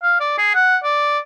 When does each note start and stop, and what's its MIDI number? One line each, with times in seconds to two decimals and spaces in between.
0.03 0.15 77
0.20 0.33 74
0.38 0.51 68
0.55 0.77 78
0.84 1.19 74